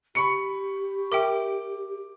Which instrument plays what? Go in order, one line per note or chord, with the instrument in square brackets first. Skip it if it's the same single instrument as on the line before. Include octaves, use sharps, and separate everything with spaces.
[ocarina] G4 [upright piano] B5 C#6 C#7
[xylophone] A#4 E5 G5 [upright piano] D6